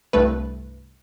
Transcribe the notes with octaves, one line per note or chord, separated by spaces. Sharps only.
C2 G2 A3 B4